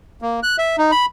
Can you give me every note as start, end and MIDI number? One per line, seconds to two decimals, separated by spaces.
0.22 0.40 58
0.43 0.56 90
0.58 0.76 76
0.78 0.91 63
0.91 1.06 83